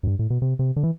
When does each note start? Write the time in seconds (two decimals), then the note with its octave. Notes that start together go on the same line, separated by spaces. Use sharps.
0.03 F#2
0.07 G2
0.19 A2
0.30 B2
0.42 C3
0.59 C3
0.76 D3
0.83 E3